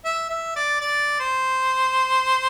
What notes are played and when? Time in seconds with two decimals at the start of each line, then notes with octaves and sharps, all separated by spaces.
0.05 E5
0.30 E5
0.56 D5
0.81 D5
1.20 C5